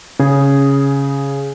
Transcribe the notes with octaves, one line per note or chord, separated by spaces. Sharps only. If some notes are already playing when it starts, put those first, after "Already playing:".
C#3 G#4